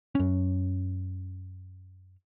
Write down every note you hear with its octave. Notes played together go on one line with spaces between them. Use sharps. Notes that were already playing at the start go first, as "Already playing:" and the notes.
F#2 C#4